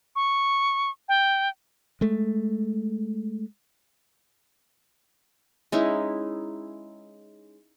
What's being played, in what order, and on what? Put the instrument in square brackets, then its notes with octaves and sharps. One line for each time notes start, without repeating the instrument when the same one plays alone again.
[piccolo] C#6
G5
[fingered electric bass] G#3 A3
[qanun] G#3 C#4 D#4 E4